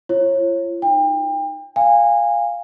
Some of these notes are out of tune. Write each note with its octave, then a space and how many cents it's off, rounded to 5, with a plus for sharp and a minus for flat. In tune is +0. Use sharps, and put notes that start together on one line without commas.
F4 -40 C#5 -30
D#4 -5 G5 +30
F5 +0 G#5 -25